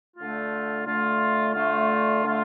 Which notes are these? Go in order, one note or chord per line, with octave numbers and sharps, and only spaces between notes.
D3 A3 F4
D3 A3 F4
D3 A3 F4
D3 A3 F4